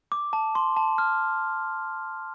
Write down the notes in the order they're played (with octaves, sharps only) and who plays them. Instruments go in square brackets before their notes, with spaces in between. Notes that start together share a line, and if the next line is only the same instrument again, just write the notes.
[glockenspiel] D6
A5
C6
A5
F6